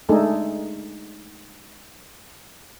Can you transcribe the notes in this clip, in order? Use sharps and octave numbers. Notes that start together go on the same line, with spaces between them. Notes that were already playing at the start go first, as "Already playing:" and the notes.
G#3 A3 D4 D#4 G#4 A4